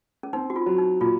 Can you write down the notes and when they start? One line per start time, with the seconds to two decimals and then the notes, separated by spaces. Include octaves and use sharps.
0.23 C#4
0.33 C4 D#4
0.50 F#4
0.56 F4
0.66 F#3
0.78 D#4
1.01 A#2 F4